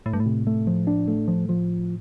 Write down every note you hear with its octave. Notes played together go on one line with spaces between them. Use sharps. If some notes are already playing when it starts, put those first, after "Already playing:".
A2 A3
G2
A2
C3
A3
F3
D4
A3
F3
F3